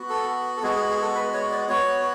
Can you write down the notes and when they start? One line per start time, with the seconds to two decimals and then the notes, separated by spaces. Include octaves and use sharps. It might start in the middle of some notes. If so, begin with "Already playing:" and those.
Already playing: B3 F#4
0.10 A4
0.57 A4
0.63 G#3 B3 F#4 G#4
0.76 G#4
0.90 G#4
1.02 A4
1.15 B4
1.34 C#5
1.52 D5
1.69 B3 F#4 C#5